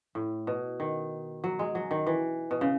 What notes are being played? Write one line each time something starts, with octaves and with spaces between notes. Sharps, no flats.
A2
B2
D#3
F#3
G#3
F#3
D#3
E3
B2
C#3